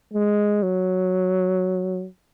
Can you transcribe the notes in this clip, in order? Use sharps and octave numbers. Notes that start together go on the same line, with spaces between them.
G#3
F#3